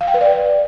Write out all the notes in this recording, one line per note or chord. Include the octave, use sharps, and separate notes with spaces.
F5
G5
B4
D5